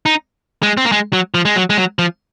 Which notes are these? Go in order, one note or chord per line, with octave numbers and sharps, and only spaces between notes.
D#4
G#3
C4
A#3
G#3
F#3
F3
G#3
F#3
G#3
F#3
F3